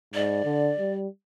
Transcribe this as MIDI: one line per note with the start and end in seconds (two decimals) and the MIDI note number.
0.14 0.41 44
0.14 0.94 74
0.45 0.73 50
0.79 1.08 55